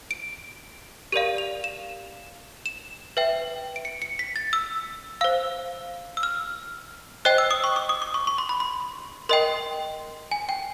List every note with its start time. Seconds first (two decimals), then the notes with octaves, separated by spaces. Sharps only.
0.11 D7
1.12 G4 A#4 D5 F5 D#7
1.38 F7
1.64 E7
2.66 E7
3.17 B4 E5 G5
3.76 D7
3.85 C#7
4.02 C#7
4.19 B6
4.36 A6
4.53 E6
5.21 C5 F5 E6
6.17 E6
6.23 F6
7.25 C5 D#5 G5 F#6
7.38 E6
7.51 D#6
7.64 C#6
7.76 D6
7.89 D#6
8.02 D6
8.14 C#6
8.27 C#6
8.38 C6
8.49 B5
8.60 C6
9.29 A#4 D#5 G5 C6
10.31 G#5
10.49 G5